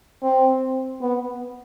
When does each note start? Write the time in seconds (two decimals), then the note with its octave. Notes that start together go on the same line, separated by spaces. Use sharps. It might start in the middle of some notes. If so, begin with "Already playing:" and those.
0.23 C4
1.01 B3